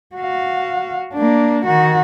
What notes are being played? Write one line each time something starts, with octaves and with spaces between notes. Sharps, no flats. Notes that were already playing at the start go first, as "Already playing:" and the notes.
F#4 F5
A#3 D4
D#3 F#4